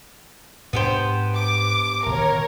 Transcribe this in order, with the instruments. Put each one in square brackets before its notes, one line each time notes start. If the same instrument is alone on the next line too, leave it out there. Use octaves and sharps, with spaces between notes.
[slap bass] G#2 D4 [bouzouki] B3 G4 C5
[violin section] D6
[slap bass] D1 B2 D#3 [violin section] A#4 C#5